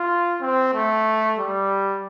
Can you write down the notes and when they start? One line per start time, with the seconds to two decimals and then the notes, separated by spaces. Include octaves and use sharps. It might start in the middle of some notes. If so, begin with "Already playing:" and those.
Already playing: F4
0.41 C4
0.74 A3
1.39 G3